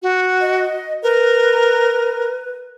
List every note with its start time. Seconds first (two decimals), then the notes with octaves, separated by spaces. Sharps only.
0.03 F#4
0.41 D#5
1.03 A#4 B4